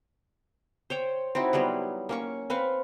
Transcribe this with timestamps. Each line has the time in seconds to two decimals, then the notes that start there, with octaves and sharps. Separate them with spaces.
0.90 C5 C#5 G5
1.35 C4 D#4 E4 F#4
1.53 F#3 G3 B3 G#4
2.09 A#3 C#4 C#6
2.50 C4 B4 F5 C#6